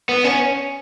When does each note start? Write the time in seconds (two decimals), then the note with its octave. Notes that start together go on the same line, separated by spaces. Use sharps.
0.09 B3
0.24 C#4